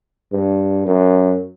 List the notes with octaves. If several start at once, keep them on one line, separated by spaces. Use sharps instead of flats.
G2
F#2